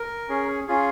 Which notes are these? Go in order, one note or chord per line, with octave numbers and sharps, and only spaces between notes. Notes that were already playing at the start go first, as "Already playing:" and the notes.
Already playing: A#4
C#4 G#4
C#4 F4 G#4